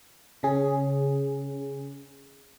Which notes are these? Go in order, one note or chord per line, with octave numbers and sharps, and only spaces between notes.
C#3 C#4 G#4